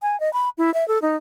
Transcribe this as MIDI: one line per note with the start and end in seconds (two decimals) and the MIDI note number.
0.02 0.19 80
0.20 0.32 75
0.33 0.49 83
0.58 0.73 64
0.74 0.87 76
0.88 1.01 69
1.02 1.16 63